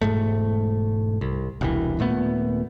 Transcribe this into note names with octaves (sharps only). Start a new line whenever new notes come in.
E1 C#2 G#2 A3
C2
E1 C2 E3
D#1 A#2 A3 B3